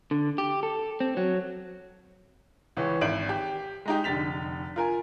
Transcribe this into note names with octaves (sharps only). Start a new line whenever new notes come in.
D3
G4
A4
C4
F#3
C#2 E3 C#4
G#1 E5 D7 F#7
G4
G#3 D#4 G4
F1 D3 A6 B6 F7
F4 A#4 G#5